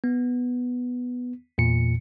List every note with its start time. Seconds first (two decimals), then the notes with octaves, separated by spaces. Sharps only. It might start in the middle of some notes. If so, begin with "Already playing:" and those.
0.04 B3
1.58 E2 A#2 C#7